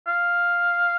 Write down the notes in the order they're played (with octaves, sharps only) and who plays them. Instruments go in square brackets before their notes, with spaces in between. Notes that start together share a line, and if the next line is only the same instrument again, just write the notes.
[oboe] F5